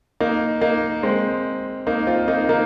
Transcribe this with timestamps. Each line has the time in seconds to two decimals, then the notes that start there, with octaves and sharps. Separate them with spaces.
0.20 A#3 D#4
0.61 A#3 D#4
1.03 G#3 C4
1.87 A#3 D#4
2.07 C4 F4
2.28 A#3 D#4
2.49 A#3 D#4